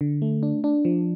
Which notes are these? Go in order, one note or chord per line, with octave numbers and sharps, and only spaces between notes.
D3
A3
D4
D4
F3